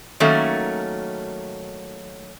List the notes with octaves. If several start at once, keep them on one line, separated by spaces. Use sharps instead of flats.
D#3 F#3 A3 A#3 C#4